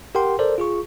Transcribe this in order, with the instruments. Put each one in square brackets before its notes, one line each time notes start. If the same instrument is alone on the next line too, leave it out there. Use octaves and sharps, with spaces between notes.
[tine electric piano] G4 A#4 F#5 G5 C6
A4 A#4 C5 D5
F4 G#4 C#6